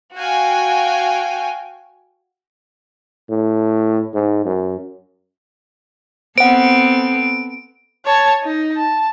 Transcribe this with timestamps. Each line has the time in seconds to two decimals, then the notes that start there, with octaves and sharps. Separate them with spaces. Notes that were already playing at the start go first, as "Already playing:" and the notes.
0.16 F#4 F5 G5 G#5
3.30 A2
4.14 G#2
4.45 F#2
6.38 B3 C4 A4 C5 F#5 D7
8.05 C#5 A5
8.44 D#4
8.77 A5